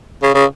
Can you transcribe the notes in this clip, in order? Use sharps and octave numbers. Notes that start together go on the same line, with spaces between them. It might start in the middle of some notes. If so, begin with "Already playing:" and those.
C#3
C#3